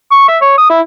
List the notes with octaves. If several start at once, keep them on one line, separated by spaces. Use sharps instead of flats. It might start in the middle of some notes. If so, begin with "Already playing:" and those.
C#6
E5
C#5
D#6
E4